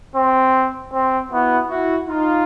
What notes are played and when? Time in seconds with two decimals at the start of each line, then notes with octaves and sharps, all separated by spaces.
0.16 C4
0.93 C4
1.31 B3 E4 F#4
1.69 E4 F#4
2.08 D#4 F4